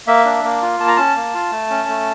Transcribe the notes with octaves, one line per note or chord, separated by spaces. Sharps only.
A#3 E5
D4
A#3
F4
A#3 A5
A#5
C#4 A5
A#3
F4
A3
C#4
A3